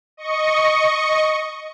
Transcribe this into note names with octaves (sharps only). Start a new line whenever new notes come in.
D#5 C#6 C#7